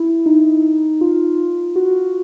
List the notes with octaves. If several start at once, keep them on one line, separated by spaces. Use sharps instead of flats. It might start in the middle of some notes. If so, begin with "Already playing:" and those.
Already playing: E4
D#4
F4
F#4